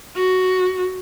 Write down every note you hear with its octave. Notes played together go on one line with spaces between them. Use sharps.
F#4